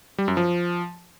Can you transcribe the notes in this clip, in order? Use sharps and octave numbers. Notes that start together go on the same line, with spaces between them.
G3
F#2
F3